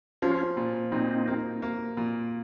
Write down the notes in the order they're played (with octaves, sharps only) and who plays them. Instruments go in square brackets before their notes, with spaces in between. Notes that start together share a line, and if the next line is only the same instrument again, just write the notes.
[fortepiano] F3 [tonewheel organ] C#4 F4
[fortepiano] A#2
[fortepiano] A#2 [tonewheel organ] C4 D#4
[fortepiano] A#3
A#3
A#2